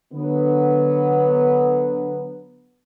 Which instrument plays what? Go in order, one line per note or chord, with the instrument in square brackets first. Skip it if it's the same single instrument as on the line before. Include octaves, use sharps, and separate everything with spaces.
[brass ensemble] D3 F#3 B3